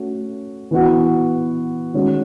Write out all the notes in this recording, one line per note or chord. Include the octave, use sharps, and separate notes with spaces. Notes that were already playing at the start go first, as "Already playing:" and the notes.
Already playing: A3 C#4 F#4
E3 B3 F#4
D#3 G#3 C#4 F#4